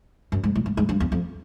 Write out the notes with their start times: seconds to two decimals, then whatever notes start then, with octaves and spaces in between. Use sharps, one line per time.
0.32 F#2
0.44 G#2
0.56 A2
0.66 G#2
0.77 G#2
0.89 G2
1.00 E2
1.12 F2